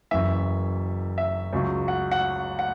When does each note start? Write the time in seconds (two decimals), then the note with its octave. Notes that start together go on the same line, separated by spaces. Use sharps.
0.11 F#1 F#2 E3 E5
1.18 E5
1.53 C#2 C#3 F#3
1.88 F#5
2.11 F#5
2.59 F#5